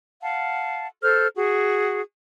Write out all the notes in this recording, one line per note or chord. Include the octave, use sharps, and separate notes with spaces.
F5 F#5 A5
A4 C5 F6 G6
F#4 G#4